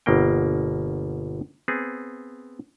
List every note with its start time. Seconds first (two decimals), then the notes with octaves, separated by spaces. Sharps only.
0.06 G1 B2 A#3 G5
1.68 B3 C4 G#4